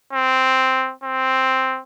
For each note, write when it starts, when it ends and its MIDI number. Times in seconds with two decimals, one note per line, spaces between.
0.13 0.93 60
1.04 1.80 60